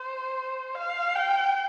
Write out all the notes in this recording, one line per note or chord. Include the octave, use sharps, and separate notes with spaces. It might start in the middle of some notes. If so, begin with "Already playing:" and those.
Already playing: C5
F5
G5